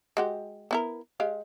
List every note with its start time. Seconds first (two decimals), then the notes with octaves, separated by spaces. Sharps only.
0.17 G#3 F#4 G4
0.71 B3 E4 A#4
1.20 G#3 G4 F5